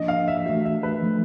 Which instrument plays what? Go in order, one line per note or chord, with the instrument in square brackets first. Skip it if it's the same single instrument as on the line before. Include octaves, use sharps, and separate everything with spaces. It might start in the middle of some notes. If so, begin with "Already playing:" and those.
Already playing: [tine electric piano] F3 A#3 D4 [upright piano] D#5
[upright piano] F5
E5
[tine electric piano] E3 A3 D4 F#4 [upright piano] E5
[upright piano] E5
B4
[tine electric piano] F3 A3 D4